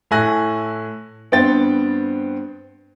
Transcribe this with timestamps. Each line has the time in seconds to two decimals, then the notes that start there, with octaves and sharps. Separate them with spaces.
0.11 A2 A4 E5 G#5 F#6 A#6
1.32 G2 B3 C4 C5 G5 A6